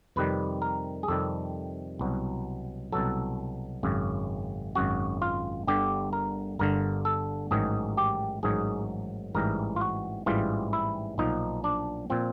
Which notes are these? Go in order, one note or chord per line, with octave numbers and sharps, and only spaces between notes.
F2 C3 D#3 G3 B4
A#4
G#4
F2 C3 D#3 G3 A4
C2 B2 F#3
C2 B2 F#3 A4
G#1 F#2 C#3
G#1 F#2 C#3 F#4
F4
G1 G2 D3 G4
A#4
G1 G2 D3 A#4
A4
A1 G#2 D#3 F#3 G#4
G4
A1 G#2 D#3 F#3 G#4
A1 G#2 E3 G3 A#4
F4
F#4
A1 G#2 E3 G3 F4
E4
B1 A#2 F3 D#4
D4
A#2 F3 C4